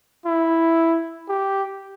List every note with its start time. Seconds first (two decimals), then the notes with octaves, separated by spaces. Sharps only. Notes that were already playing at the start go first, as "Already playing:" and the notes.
0.26 E4
1.29 G4